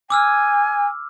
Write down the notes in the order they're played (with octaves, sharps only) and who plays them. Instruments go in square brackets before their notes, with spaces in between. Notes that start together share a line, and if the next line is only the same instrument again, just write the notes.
[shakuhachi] G#5 [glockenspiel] D6 E6 F6